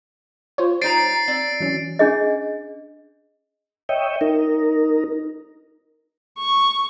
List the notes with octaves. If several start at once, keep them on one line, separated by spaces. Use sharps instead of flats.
F4 C5 C#5
G3 D#4 A#5 A6 C7 D7
C4 D5
E3 F#3 C#4
C#4 D4 G#4 D#5
C#5 D#5 E5 G5
D#4 A#4
C#6